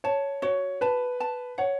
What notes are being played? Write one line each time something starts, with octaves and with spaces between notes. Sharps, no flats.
C#5 A5
F#4 C#5
B4 A5
A5
C#5 F#5